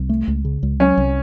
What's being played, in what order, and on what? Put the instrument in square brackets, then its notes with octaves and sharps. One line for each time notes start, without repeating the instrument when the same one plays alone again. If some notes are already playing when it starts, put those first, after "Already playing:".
Already playing: [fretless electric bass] C2
A3
C#2
C#3
C#2
[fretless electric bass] F#3 [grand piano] C#4
[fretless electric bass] C2